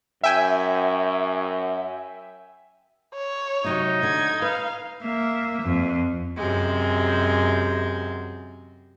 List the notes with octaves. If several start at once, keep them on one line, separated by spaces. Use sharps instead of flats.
F#2 E5 G5 G#5
C#5
C3 F#3 D#4 G4
D3 G#6
B4 F5
A#3 E5
F2
F#2 C3 G#3